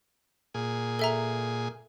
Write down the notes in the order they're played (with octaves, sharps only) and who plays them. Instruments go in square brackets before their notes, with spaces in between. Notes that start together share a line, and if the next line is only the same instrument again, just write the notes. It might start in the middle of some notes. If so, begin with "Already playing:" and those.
[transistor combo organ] A#2 G#4
[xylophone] A4 E5 A#5